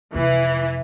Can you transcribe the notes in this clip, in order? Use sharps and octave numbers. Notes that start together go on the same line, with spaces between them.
F2 C3 E3